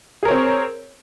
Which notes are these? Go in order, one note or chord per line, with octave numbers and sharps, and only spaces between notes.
C4 G#4 A#4 C#5